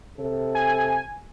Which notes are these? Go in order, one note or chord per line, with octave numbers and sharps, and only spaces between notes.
C3 A4
G#5